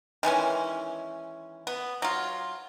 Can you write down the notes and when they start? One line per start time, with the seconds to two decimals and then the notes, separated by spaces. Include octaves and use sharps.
0.23 D#3 E3 G#3 C#4
1.67 B3
2.02 F#3 F4